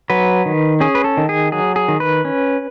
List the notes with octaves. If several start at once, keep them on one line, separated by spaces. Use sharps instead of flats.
F#3 B4
D#3
C#4 G#4
B4
A4
D#3
G#4
F#3 G#4
G#4
D#3
B4
C#4